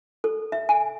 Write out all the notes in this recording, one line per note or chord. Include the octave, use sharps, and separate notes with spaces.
A4
E5
G#5